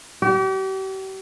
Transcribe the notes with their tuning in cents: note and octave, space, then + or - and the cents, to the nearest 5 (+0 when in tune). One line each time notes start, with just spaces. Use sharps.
G4 -40